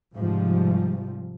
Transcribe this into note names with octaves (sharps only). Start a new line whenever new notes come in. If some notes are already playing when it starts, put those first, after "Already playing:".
G#2 C3 F3 G3